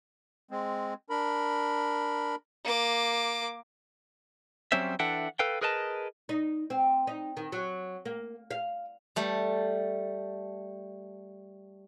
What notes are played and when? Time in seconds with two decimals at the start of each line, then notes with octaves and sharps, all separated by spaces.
0.51 G#3 C4
1.10 D4 A#4 B5
2.64 A#3 D6
4.72 F#3 G3 C4 C#4 C5 E5
4.99 E3 D4 A4 E5 F#5 G5
5.39 A4 B4 F5 G5
5.61 G#4 A#4 B4 D#5 G5 A5
6.29 D#4
6.70 C4
7.07 D#4
7.37 D#3
7.52 F#3
8.05 A#3
8.51 F5
9.16 G3 A3